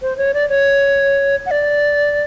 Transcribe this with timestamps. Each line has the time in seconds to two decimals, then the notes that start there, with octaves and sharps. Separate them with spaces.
0.02 C5
0.17 C#5
0.34 D5
0.49 C#5
1.46 F#5
1.51 D5